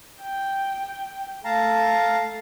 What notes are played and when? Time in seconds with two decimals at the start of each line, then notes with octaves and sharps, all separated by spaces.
0.21 G5
1.45 A3 F5 A5 A#5